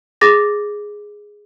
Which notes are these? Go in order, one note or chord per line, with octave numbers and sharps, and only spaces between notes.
G#4 D6 A6 A#6